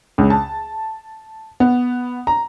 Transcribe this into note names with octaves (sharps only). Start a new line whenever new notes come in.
C#2
A5
B3
A#5